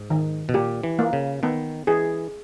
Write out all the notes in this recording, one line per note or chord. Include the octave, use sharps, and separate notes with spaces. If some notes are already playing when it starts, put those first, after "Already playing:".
Already playing: G#2
D#3
B2
A#2 G4
E3
A#3
C#3
D#3 B3
E3 G#4